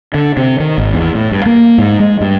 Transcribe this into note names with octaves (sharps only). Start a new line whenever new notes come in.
D3
C3
D#3
G#1
E2
A2
G2
A#3
G#2
G#3
G2